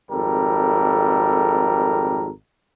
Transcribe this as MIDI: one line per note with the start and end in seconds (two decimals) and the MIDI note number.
0.11 2.28 32
0.11 2.28 41
0.11 2.28 55
0.11 2.28 69
0.11 2.28 70